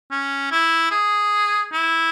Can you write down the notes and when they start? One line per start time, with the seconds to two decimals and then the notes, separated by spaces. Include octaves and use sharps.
0.11 C#4
0.52 E4
0.91 G#4
1.72 E4